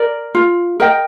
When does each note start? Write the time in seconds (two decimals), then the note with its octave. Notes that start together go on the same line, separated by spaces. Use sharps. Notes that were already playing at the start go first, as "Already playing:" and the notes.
Already playing: A#4 D5
0.35 F4
0.80 A#4 D#5 G5